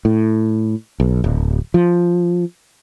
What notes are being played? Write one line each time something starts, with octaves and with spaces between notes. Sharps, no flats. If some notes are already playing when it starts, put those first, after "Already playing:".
A2
B1
D1
F3